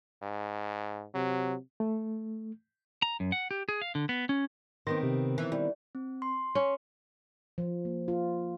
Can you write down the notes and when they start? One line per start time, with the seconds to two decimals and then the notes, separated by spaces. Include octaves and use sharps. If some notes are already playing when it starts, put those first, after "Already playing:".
0.22 G#2
1.14 C3 F#3
1.80 A3
3.02 A#5
3.20 F#2
3.32 F#5
3.51 G4
3.69 G#4
3.82 F5
3.95 D3
4.09 B3
4.29 C#4
4.87 D#3 B3 C4 A#4 C6 A#6
5.03 C3
5.38 E3
5.52 G3 E4
5.95 C4
6.22 C6
6.55 C#4
7.58 F3
7.85 A#3
8.08 F4